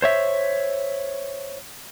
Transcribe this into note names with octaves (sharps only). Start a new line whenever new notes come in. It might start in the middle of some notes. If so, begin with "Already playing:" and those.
C5 C#5 E5